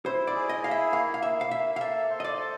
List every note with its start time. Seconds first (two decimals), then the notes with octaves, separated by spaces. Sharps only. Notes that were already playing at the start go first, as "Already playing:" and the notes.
0.05 E4 C5
0.27 D5
0.35 G#4
0.49 D#5
0.64 E4 F5
0.71 E5
0.93 A#3 F5
1.14 F5
1.23 A#3 E5
1.41 F5
1.51 A#3 E5
1.76 F5
1.80 A4 E5
2.10 C5
2.20 D#5
2.25 D5
2.39 A4